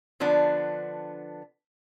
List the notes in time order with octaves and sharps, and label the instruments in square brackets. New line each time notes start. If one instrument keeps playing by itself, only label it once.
[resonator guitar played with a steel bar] D3 F3 B3 D4